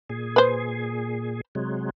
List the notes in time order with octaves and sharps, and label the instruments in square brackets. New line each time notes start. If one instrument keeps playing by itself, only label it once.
[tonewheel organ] A#2 G#4
[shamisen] B4 C5
[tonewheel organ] C3 F#3 G#3